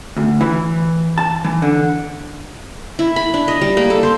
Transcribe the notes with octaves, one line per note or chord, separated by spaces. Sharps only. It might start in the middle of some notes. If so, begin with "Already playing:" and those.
D2
E3
A5
E3
D3
E4
B5
D4
D#5
G3
A#3
A4
C5